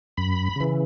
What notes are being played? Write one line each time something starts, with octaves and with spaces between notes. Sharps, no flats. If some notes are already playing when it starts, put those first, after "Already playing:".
F#2 B5
C#3 E3